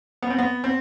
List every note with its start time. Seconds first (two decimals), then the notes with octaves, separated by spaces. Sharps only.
0.22 B3
0.30 C4
0.39 B3
0.64 C4